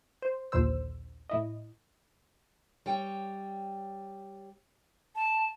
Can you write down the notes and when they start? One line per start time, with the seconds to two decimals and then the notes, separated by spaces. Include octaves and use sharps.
0.22 C5
0.52 A#1 D#2 A#2 D3 C5 E6
1.30 A2 E4 D#5
2.86 G3 C#5 G5
5.15 A5